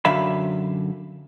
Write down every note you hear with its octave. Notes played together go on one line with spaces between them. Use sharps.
F#2 D3 E5 F5 B5